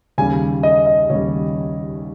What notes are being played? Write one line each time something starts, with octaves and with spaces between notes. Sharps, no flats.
D#2 C#3 G3 G#5
D#5
D#5
D#2 C#3 G3 C#5